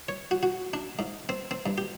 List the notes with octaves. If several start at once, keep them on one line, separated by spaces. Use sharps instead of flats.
C#5
F#4
F#4
D4
G#2
C4
C4
G2
G4